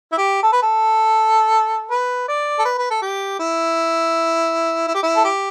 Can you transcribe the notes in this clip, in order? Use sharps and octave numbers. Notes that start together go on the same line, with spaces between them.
E4
G4
A4
B4
A4
B4
D5
A4
B4
B4
A4
G4
E4
E4
G4
E4
A4
G4